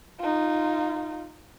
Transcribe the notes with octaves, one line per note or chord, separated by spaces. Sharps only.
D#4 F4